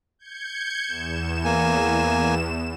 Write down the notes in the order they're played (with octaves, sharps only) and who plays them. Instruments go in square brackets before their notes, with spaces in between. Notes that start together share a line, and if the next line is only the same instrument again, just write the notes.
[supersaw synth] G6 G#6 C#7
E2 E7
[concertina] A#3 G#5